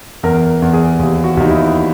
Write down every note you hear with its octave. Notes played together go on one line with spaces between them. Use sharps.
E2 A#4
E2
G#4
D#2
F#4
D#2 D#4
E4